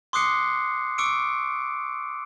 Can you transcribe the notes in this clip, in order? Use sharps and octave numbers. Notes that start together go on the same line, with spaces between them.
C6 D6 D#6 F#6 C7 C#7
C#6 D6 E6 C#7 D7